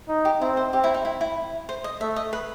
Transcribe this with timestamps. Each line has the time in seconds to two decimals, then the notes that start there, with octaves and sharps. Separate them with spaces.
0.09 D#4
0.25 G4
0.41 C4 E4
0.57 C5
0.73 C4 G4
0.84 E4
0.94 D#4
1.05 E4
1.21 E4
1.69 C5
1.84 D#5
2.01 A3 E5
2.16 D#5
2.33 B4